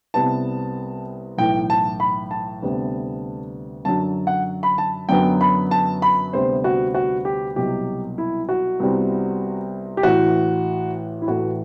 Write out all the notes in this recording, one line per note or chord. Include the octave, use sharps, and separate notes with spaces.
C2 C3 G3 B3 A5
B1 A2 E3 G5
A5
B5
A5
D2 C3 G3 B3
F#2 D3 F#3 A5
F#5
B5
A5
F#2 D3 F#3 B3 G5
B5
A5
B5
D2 C3 G3 B3 C5
F#4
F#4
G4
C2 B2 F#3 G4
E4
F#4
C2 C3 G3 B3
G4
A1 A2 E3 F#4
E4
A1 A2 E3 A3 F#4